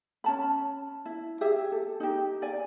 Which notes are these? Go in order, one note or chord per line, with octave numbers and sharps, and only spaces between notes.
C#4 A5 B5
E4
G4 G#4 E5
A4
D#4 G4
D5 G#5